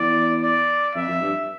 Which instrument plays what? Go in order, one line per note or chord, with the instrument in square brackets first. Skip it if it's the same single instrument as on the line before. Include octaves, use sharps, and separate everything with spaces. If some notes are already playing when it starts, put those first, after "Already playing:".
Already playing: [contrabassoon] E2 [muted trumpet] D5
[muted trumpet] D5
[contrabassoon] F2 [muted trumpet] E5
[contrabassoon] F2
G2